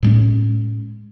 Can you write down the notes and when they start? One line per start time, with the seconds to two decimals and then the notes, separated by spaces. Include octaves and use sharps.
0.03 A2 G#3 C#4